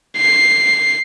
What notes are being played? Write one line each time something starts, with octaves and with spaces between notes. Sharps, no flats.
C7